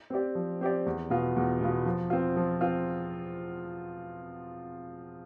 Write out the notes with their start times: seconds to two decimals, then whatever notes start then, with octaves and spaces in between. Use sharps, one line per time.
0.10 C4 G4 D5
0.35 F3
0.61 C4 G4 D5
0.86 E2
1.10 B2 B3 F4
1.36 E2
1.61 B2 B3 F4
1.86 F3
2.10 C4 F4
2.36 F3
2.61 C4 F4